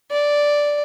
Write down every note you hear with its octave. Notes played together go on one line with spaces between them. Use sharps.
D5